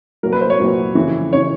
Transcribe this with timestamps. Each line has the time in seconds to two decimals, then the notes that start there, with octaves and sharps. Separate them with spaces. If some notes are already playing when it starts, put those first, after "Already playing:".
0.23 C2 A#2 F#3 A#4
0.32 B4
0.41 C5
0.50 C#5
0.60 C2 A#2 F#3
0.95 F2 C#3 E3
1.33 C#3 E3 C#5